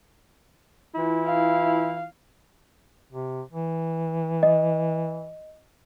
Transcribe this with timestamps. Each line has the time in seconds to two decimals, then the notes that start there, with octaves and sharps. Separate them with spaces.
0.95 E3 E4 F4
1.26 F5
3.12 C3
3.52 E3
4.43 D#5